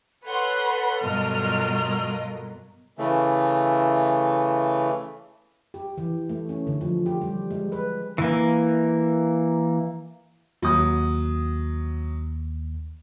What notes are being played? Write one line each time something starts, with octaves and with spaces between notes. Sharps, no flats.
A4 B4 C#5 F#5 C6
G2 B2 F#3 F4 A#4 D#5 F6
C#3 E3 A3
G4
E3
A3
C#4
D3
F3
G4
G3
G#3
B4
E3 A#3
D#2 F#3 D#6